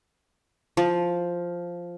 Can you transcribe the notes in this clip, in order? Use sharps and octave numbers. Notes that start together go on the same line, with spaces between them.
F3